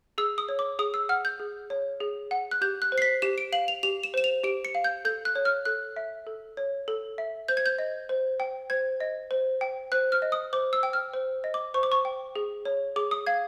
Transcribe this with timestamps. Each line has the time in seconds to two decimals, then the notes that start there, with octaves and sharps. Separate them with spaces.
0.18 G#4 E6
0.38 D#6
0.49 C#5
0.59 D6
0.79 G#4 D#6
0.94 E6
1.09 F#5 F6
1.25 G6
1.40 G#4
1.70 C#5
2.00 G#4
2.31 F#5
2.51 F#6
2.62 G4 G6
2.82 F#6
2.92 C5
2.98 C7
3.02 B6
3.22 G4 E7
3.38 D7
3.52 F5 F#7
3.68 F7
3.83 G4 F7
4.03 E7
4.14 C5 E7
4.24 F7
4.44 G4 D7
4.65 C#7
4.75 F5
4.84 G6
5.05 A4 G6
5.25 F#6
5.35 C#5
5.45 F6
5.65 A4 F#6
5.96 E5
6.27 A4
6.57 C#5
6.88 A4
7.18 E5
7.48 C5 G6
7.57 G#6
7.66 G6
7.79 D#5
8.09 C5
8.40 G5
8.70 C5 G#6
9.00 D#5
9.31 C5
9.61 G5
9.92 C5 F#6
10.12 F6
10.22 D#5
10.32 D#6
10.53 C5 D6
10.73 E6
10.83 G5
10.93 F6
11.14 C5
11.44 D#5
11.54 D6
11.74 C5 C#6
11.83 D6
11.92 C#6
12.05 G5
12.36 G#4
12.65 C#5
12.96 G#4 D6
13.11 D#6
13.27 F5 G#6